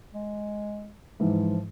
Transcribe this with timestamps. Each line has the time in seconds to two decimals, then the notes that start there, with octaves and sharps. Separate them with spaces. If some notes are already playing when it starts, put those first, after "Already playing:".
0.14 G#3
1.20 G#2 E3 F3